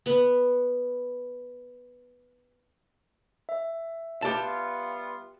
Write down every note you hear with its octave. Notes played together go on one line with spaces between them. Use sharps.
B3 B4
E5
G3 B3 F4 G4 A5